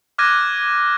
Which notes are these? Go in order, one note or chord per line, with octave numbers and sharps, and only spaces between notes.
D6 F6 F#6 G#6 A#6 D#7